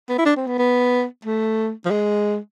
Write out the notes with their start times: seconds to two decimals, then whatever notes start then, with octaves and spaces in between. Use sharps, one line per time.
0.09 B3
0.18 E4
0.26 D4
0.36 C4
0.47 B3
0.58 B3
1.25 A3
1.86 F3
1.91 G#3